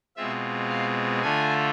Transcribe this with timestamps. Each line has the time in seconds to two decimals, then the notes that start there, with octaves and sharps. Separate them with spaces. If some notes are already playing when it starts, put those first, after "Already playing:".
0.16 B2 G#3 C4 F4 E5
0.70 F5
1.22 D3 A3 D4 F4 G#5